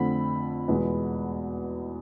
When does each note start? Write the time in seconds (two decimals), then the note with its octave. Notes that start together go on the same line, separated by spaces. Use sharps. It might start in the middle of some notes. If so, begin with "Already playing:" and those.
Already playing: F2 D3 A3 C4 B5
0.68 E2 B2 G#3 B3